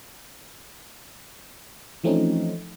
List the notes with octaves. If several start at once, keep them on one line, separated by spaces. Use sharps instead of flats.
E3 F3 A3 C4 C#4 D#4